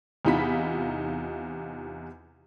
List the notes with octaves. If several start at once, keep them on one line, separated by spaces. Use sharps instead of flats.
E2 C3 D#4 F4 B5 B6